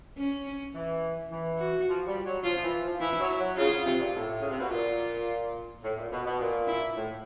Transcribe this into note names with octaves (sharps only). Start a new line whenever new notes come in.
C#4
E3
E3
F#4
F3
G3
F#3
F3 F4
E3
F3
E3 E4
F#3
F#3
C#3 F4
C#3
C3
A#2
A2
C#3
C3
B2
A#2 F4
A2
A#2
B2
B2
A#2
E4
A2